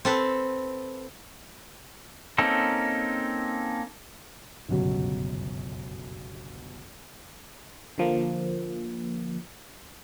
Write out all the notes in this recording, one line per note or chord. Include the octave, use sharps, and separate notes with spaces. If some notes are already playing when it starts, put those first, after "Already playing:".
C4 A4 B4
A#3 C4 C#4 D#4 A4
G1 C#2 F#2 B2
D3 F3 A#3